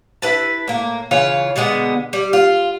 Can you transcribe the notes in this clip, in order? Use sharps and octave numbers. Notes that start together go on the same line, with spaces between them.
E4 B4 A5
A2 A#3
C#3 E3 F4 C#5
B2 D3 G#3 B3
G3
F4